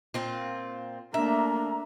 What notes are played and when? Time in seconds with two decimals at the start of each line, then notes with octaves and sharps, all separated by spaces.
0.14 A#2 C4 F4
1.14 A3 A#3 D4 E5 A#5